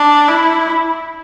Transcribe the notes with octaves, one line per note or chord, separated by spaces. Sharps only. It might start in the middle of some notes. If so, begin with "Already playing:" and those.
Already playing: D4
E4